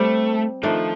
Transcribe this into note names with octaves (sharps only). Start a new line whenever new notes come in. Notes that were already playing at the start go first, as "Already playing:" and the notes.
Already playing: G3 A3 C4 G4
D#3 F3 A3 D4